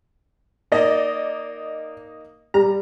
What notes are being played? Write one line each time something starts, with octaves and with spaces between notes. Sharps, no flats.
A#3 D#4 D5 D#5
G3 A#5